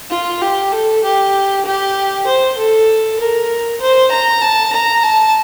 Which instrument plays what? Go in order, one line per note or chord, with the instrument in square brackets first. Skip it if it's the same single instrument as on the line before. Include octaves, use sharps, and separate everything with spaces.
[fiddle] F4
G4
A4
G4
G4
C5
A4
A#4
C5
A#5
A5
A#5
A5